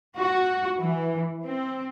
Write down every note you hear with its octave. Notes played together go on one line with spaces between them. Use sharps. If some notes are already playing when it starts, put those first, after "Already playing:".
F#4
E3
C4